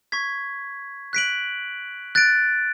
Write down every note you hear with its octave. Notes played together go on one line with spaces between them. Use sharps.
C#6 G#6 B6
F#6 B6 D7 F#7
F#6 A6 D7